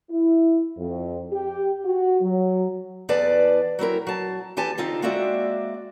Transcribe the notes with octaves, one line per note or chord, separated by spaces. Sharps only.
E4
F2
G4
F#4
F#3
E2 G#4 B4 D5 A5
F#3 C4 E4 A#4
F#3 A5
E3 G4 G#5 A5
D3 C4 D#4 F4
G#3 A#3 C4 F#4 D5 E5